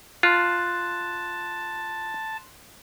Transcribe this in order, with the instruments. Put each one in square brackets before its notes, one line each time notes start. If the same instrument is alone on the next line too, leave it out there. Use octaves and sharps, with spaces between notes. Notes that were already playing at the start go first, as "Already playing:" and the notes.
[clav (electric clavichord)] F4 [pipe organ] A5 [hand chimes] C6 F#6